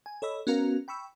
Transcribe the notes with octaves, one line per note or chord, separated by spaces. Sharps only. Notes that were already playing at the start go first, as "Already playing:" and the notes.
G#5
A4 C#5 D#5 B5 E6
B3 C#4 F#4 A#4 F5 A#5
G5 B5 C#6 E6